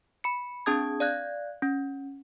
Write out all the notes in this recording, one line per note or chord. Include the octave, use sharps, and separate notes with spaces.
B5 C#7
C4 D4 G#4 A5 D#6 G#6
D5 F5 F#6 G#6
C#4